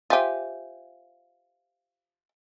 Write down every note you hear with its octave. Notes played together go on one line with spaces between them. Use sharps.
F4 G4 C5 E5 G#5